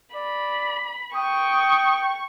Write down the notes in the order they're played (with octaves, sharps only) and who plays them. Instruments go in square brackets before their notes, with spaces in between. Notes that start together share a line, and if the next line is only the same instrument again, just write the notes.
[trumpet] D5 [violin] B5
[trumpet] G5 [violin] C#6 [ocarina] D#6